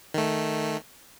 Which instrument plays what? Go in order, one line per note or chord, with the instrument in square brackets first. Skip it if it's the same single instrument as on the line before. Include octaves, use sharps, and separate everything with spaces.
[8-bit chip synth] D#3 A3